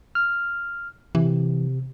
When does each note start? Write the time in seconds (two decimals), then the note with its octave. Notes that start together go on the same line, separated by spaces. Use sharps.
0.15 F6
1.15 C3 E3